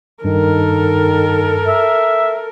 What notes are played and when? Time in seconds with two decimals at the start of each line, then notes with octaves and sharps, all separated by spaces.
0.24 G2 D#3 A4 A#4
1.67 E5